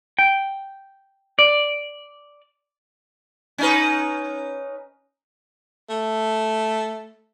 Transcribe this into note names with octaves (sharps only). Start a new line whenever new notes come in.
G5
D5
C#4 D#4 B4
A3